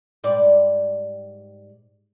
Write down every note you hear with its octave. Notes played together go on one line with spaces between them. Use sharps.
G#2 G3 D5